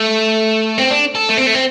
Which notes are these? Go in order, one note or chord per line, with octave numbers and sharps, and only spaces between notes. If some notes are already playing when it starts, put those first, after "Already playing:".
Already playing: A3
C4
D4
A4
A3
C4
A3
C4